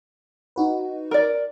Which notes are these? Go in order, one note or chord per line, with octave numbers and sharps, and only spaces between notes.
D#4 F#4 B4
A#4 D5